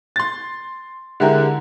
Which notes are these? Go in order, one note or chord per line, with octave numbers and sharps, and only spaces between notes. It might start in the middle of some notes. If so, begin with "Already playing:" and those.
C6 A6
D3 G#3 E4 G4 A#4